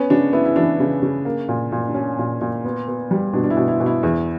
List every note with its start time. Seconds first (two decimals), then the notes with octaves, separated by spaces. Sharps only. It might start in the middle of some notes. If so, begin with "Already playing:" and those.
Already playing: B3 C#4
0.10 C#3 D4
0.33 B3 E4
0.45 E4
0.56 E3 D4
0.80 C#3
1.03 C#3
1.25 A#3
1.49 A#2
1.72 A#2
1.88 D4
1.94 C#4
2.19 A#2
2.41 A#2
2.65 B3
2.88 B3
3.11 G3
3.33 B2 D4
3.44 D4
3.50 E4
3.57 B2
3.68 E4
3.80 B2
3.86 E4
4.03 E2